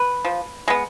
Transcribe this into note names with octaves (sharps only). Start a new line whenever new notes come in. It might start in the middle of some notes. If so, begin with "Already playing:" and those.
Already playing: B4
F3
G#3 B3